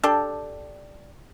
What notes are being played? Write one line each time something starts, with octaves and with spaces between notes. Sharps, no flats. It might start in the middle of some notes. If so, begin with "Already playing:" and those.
D4 G4 A4